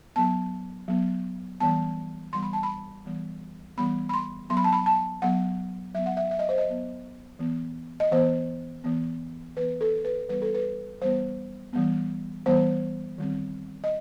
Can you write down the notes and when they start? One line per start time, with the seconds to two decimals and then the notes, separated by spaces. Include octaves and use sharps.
0.16 F#3 B3 A5
0.88 F#3 B3
1.60 E3 G3 B3 A5
2.33 E3 G3 B3 C6
2.42 B5
2.53 A5
2.63 B5
3.06 E3 G3 B3
3.77 E3 G3 B3 B5
4.09 B5
4.14 C6
4.50 F#3 B3 C6
4.57 B5
4.64 A5
4.73 B5
4.86 A5
5.22 F#3 B3 F#5
5.95 F#3 B3 E5
6.06 F#5
6.17 E5
6.31 E5
6.39 D#5
6.49 C5
6.58 D#5
6.68 F#3 B3
7.39 E3 B3
8.00 D#5
8.11 E3 B3 C5
8.84 E3 B3
9.56 E3 B3 B4
9.81 A4
10.05 B4
10.28 E3 G3 B3 B4
10.42 A4
10.55 B4
11.01 E3 G3 B3 C5
11.73 E3 G3 B3
12.46 E3 G3 B3 C5
13.18 D#3 G3 C4
13.84 D#5